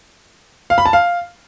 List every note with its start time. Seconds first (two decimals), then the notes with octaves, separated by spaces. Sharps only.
0.70 F5
0.78 B5
0.86 A5
0.93 F5